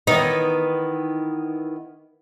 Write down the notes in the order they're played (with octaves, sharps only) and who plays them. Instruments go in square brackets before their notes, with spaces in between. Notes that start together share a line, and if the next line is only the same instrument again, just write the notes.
[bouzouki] D#3 E3 B3 [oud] D#4